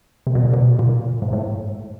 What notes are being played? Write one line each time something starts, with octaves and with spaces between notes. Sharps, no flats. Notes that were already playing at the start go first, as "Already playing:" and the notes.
C3
B2
A#2
B2
A#2
G#2
A2